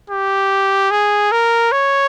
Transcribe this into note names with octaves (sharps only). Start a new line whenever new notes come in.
G4
G#4
A#4
C#5